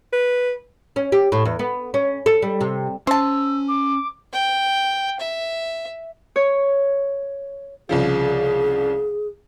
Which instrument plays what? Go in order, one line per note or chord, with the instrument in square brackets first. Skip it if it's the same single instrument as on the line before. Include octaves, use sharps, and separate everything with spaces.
[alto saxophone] B4
[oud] C#4
G4
A2
E2
B3
C#4
A4
G3
C3
[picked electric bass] C#4 [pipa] C5 A5 [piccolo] E6
[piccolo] D6
[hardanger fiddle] G5
E5
[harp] C#5
[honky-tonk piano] C2 C#3 F3 [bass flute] G#4